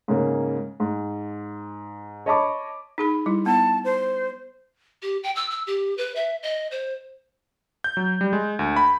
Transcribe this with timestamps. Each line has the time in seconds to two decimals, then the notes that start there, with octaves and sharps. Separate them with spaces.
0.08 G#2 C#3 A#3
0.80 G#2
2.26 C#5 D#5 A5 B5 C#6 D6
2.98 D#4 G#4 B5
3.26 G3 E4
3.46 B3 A5
3.85 C5
5.02 G4
5.23 G5
5.36 E6
5.50 E6
5.67 G4
5.98 B4
6.16 E5
6.43 D#5
6.71 C5
7.84 G6
7.97 F#3
8.21 G3
8.33 G#3
8.59 D2
8.76 B5